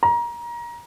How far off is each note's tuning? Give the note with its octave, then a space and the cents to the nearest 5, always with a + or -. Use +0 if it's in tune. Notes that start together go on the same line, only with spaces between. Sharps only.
A#5 +25